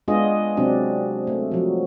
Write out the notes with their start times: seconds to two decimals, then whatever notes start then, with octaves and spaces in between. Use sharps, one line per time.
0.08 G#3 B3 D4 F4 G#4 D#5
0.57 C3 F#3 C4 D4
1.27 A3
1.51 F3 F#3